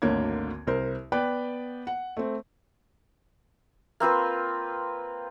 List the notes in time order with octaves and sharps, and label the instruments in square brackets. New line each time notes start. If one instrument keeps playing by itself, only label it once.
[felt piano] G#1 D2 D3 A#3 C#5 G#6
C2 A#4 C5
B3 B4 D5 G5
F#5
A3 C4
[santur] A#3 C4 F4 B4